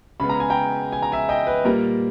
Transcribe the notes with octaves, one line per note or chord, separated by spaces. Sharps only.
C#3 G#3 B3 B5
A#5
G#5
G5 A#5
G#5
A#5
E5 G#5
D#5 G5
B4
A#2 G3 A#3 A#4